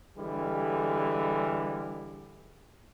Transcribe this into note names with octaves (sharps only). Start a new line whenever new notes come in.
D3 E3 G3 G#3